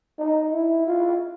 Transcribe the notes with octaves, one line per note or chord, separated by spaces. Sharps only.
D#4
E4
F4